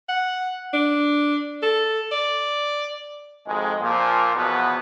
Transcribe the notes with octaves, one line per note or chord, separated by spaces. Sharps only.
F#5
D4
A4
D5
G#1 F2 G#3
A#2 F3
E2 B2 F3 B3